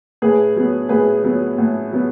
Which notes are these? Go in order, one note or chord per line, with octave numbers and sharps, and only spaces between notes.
A2 G#4 B4
F#3 B3
A2 G#4 B4
F#3 B3
A2
F#3 B3